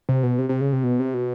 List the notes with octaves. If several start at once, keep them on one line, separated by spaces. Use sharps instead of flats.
C3
B2
C3
C3
C#3
C3
B2
C3
B2